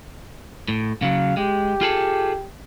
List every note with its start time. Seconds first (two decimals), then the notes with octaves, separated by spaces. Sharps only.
0.68 A2
1.02 C#3 F#3 F5
1.37 G#3 G4
1.81 F4 G#4 A4